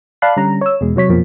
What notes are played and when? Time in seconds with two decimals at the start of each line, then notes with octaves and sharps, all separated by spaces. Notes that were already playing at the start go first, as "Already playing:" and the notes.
0.22 D5 F5 A5 B5 F#6 C7
0.36 D3 G3 C#4 A#5
0.61 C#5 E6
0.81 E2 B2 G#3
0.96 C3 F#3 C#5 B6
1.09 F2 B2 F3 A#3